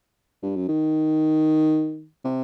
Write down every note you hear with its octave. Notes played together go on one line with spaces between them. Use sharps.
G2
F#2
D#3
C3